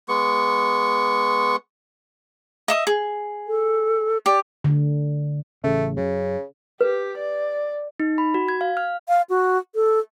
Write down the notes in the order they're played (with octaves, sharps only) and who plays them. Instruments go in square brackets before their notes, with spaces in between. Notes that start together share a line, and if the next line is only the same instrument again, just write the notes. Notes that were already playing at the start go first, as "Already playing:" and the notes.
[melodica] G#3 B3 C#6
[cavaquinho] D#5 E5 D#6
G#4
[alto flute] A4
[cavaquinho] G4 [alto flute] D5
[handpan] D3
[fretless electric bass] A1 C#3 [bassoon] A3
[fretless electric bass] F#2 [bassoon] C#3
[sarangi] G4 [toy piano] B4
[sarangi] D5
[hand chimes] D#4
B5
F#4
G#6
F5
F6
[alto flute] F5
F#4
A4